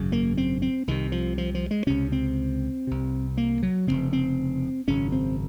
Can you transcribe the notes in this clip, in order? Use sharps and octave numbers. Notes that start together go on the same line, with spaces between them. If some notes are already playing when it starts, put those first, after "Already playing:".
Already playing: G#1 F#2 C#3
A#3
C4
C4
C2 C3 D#3
F3
F3
F3
G#3
C#2 C3 C#4
C4
C2 C3
A#3
F#3
F1 D#2 C#3 C4
C4
G#1 F#2 C#3 C#4
C4